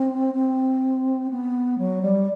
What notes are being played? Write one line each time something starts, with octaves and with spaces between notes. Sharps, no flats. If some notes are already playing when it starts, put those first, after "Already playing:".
Already playing: C4
C4
B3
F#3
G3